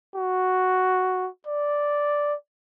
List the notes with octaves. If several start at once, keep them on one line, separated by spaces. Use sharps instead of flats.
F#4
D5